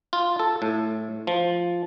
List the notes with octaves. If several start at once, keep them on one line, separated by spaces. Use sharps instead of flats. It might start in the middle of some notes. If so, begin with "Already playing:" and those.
F4
A4
A2
F3